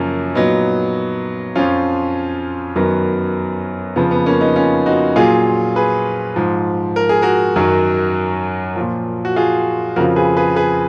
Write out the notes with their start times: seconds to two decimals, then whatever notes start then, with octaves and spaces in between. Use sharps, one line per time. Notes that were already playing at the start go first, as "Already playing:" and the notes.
Already playing: F#2 C#3 F3 A#3 C#4
0.35 A#2 F#3 B3 D#4
1.56 F2 F3 C#4 F4
2.76 F#2 D#3 F#3 B3
3.96 F2 C#3 F3 B3
4.11 B3
4.26 A#3 C#4
4.41 B3 D#4
4.56 C#4 F4
4.86 D#4 F#4
5.16 A#2 F#3 F4 G#4
5.76 G#4 B4
6.36 G#2 F3
6.96 A#4
7.09 G#4
7.22 F#4 A#4
7.56 F#2 D#3 F#3
8.76 A#2 F3
9.25 F#4
9.36 F4 G#4
9.96 F2 C#3 F3 F#4 A#4
10.16 G#4 B4
10.37 G#4 B4
10.56 G#4 B4